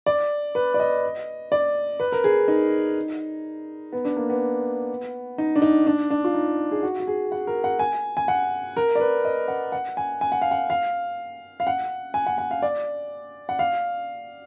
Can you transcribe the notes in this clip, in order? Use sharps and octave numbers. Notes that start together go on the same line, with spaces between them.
D5
B4
D5
D#5
D5
B4
A#4
G#4
D#4
B3
D4
A#3
B3
D#4
D4
D#4
D4
D4
F4
D#4
G#4
F#4
F#4
G#4
F#5
A#4
F#5
G#5
G#5
F#5
A#4
D5
B4
D#5
F#5
F#5
G#5
G#5
F#5
F5
F#5
F5
F5
F#5
G#5
F#5
F#5
F5
D5
F#5
F5